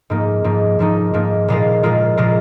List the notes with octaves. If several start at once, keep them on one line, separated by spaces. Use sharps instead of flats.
G#2 F3 A#3 D#4
G#2 F3 A#3 D#4
G#2 F3 A#3 D#4
G#2 F3 A#3 D#4
A#2 F3 G#3 F4 A#4
A#2 F3 G#3 F4 A#4
A#2 F3 G#3 F4 A#4